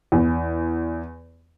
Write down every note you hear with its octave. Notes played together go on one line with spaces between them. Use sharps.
E2